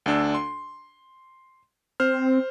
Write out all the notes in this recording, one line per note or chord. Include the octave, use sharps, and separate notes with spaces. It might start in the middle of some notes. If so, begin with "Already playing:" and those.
D2 D4 E6
C6
C4 C5 F6